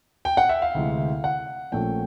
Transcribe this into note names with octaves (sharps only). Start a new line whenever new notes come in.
G5
F#5
E5
F5
D2 C3 E3 G#3
F#5
A#1 A#2 F3 A3 C#4 G5